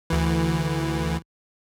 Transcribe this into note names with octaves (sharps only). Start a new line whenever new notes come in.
D2 E3